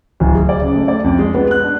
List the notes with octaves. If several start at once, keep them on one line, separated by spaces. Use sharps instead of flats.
D1
G#4
D5
C#3
A3
D5
F2
G#3
B3
F#6
D4